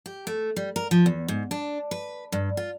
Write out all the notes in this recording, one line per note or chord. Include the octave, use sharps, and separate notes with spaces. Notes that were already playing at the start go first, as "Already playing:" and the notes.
G4
A3
G3
A#4
F3
E2
G#2
D4
B4
G2
F4